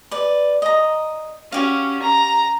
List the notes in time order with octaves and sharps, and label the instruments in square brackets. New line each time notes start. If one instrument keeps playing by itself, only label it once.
[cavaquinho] B4 D5
D#5 A#5
[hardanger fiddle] C#4 [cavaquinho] F#4 G4 F5
[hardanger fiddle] A#5